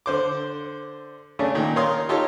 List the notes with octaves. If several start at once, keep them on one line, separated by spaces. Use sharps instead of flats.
D3 C5 D6
C#3 A3 C#4 D4
A#2 D#3
A#4 C#5 F5 C6 D#6
D#4 F4 G4 A4 C#5